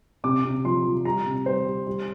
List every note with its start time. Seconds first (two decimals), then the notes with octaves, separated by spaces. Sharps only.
0.24 C3 D6
0.44 C3
0.64 F3 C6
0.85 F3
1.05 G3 A#5
1.26 C3
1.46 G3 C5
1.67 G3
1.87 G3